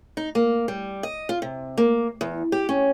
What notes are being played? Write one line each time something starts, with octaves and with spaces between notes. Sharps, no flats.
D#4
A#3
G3
D#5
F4
C3
A#3
E2
G4
C#4